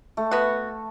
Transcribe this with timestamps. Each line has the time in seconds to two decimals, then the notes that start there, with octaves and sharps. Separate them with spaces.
0.17 A3
0.31 B3 F#4